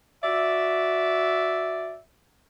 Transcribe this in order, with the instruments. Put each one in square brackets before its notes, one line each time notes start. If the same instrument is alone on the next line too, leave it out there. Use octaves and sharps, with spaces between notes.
[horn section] F#4 D5 E5